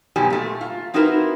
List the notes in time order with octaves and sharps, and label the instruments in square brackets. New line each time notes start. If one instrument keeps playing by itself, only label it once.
[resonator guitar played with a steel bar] G#2 B2 F#3 G4 G#5
A#2 A3
F4
C4 D#4 E4 F#4 A#4 B4